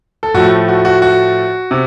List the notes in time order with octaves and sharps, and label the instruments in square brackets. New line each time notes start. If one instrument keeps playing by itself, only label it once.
[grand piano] A4
A2 F3 A3 F#4
F#4
F#4
F#4
C3